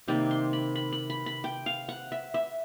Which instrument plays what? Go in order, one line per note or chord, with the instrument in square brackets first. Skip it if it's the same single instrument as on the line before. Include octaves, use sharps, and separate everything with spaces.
[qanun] C3 D#3 G3 A#3
C6
B5
B5
B5
B5
B5
G5
F5
F#5
E5
E5